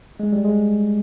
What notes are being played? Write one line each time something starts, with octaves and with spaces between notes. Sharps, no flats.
G#3
G3
G#3